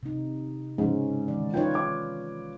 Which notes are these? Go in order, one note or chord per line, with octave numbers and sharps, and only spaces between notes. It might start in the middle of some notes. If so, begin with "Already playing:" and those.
C3 D#4
G#2 C#3 G#3 C#4
D#3 E3 D5
D#4 F4 B4 C#5 D5 G5
D6